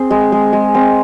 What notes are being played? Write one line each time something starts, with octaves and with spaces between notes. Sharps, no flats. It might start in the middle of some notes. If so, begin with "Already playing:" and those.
Already playing: C4 G#4
G#3
G#3
G#3
C4